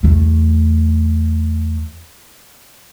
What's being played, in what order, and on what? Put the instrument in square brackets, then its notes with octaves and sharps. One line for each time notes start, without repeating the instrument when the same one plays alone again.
[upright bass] E2 A3